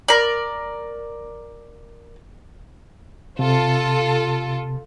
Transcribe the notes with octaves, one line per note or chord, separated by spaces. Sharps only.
A#4 D5
C3 F4 A4